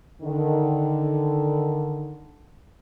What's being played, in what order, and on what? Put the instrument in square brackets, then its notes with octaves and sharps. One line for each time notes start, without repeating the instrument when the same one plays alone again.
[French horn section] D3 D#3